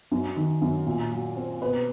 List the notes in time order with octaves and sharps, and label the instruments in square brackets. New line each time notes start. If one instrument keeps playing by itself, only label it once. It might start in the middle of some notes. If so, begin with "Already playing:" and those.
[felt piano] F#2
D#3
F#2
A#2
F#3
C4
B2 B4